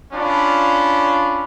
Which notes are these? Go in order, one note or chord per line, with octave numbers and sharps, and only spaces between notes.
C#4 D4 F4 B5